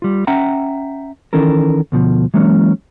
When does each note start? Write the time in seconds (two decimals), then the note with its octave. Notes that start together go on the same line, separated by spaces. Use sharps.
0.02 G3 F4
0.27 C#4 E5 F#5 G5 A#5
1.33 D#3 E3 C#4 A4 A#4
1.92 D2 B2 F3
2.34 E3 F#3 G#3 A#3 C#4